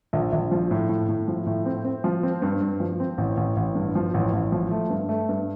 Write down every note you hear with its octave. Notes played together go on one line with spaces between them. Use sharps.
A#1
A#1
F3
A2
A2
A2
F3
A2
C4
C4
F3
C4
G2
G2
F3
C4
A1
A1
A1
G2
F3
A1
A1
F3
A3
G2
A3
G2